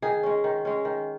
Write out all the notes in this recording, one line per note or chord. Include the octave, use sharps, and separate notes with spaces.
D#3 G#4
G#3 C#4
D#3
G#3 C#4
D#3